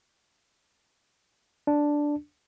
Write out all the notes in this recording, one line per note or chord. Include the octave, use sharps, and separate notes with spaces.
D4